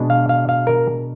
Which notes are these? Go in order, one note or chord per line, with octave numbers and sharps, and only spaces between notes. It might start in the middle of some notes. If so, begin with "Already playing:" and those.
Already playing: B2 G#3 D4
F5
F5
F5
A#4